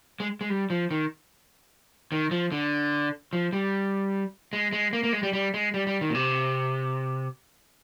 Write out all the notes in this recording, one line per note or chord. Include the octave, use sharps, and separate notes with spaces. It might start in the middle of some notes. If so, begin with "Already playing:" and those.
G#3
G#3
G3
F3
D#3
D#3
F3
D3
F3
G3
G#3
G#3
A#3
A#3
G#3
G3
G3
G#3
G3
G3
D#3
A#2
C3